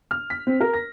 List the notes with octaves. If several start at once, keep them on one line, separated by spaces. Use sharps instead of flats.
F6
B6
C4
A#4
A#6